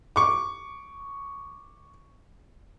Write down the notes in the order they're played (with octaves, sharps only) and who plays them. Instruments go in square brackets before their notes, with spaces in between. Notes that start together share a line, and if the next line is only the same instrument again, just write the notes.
[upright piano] C#6 D6